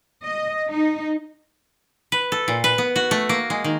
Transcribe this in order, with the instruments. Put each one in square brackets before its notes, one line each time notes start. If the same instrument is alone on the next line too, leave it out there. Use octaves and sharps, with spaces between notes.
[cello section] D#5
D#4
[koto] B4
A4
A#2
B4
B3
F#4
A3
A#3
G#3
D#3